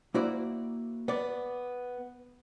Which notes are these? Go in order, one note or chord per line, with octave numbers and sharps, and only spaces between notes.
A#3 E4 F#4 C5 D5
B3 D5